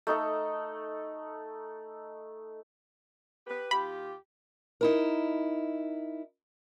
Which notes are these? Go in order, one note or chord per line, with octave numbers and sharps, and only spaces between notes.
A3 D#4 A4
G4 B4
D#2 F4 G4 B5
D#4 E4 A#4